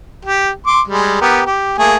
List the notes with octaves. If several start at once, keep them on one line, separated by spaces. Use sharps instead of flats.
G4
C6 D6
G3 G#3
B3 G4 A#4
G4
A3 A#3 G#4